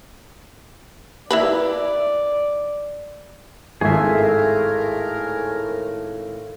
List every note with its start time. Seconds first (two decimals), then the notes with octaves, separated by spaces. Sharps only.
1.31 E4 A#4 B4 D5
3.81 G#1 A2 A3 G#4 A#4 E5